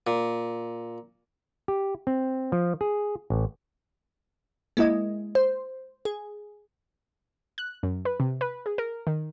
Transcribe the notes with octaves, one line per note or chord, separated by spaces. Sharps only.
A#2
G4
C4
F3
G#4
A1
G#3 A#3 E4 D#5
C5
G#4
F#6
F#2
B4
C3
B4
G#4
A#4
D#3